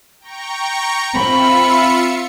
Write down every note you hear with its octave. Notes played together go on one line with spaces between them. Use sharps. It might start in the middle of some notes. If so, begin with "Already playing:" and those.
G5 A#5 C#6
C4 F4 E5 B5 C#7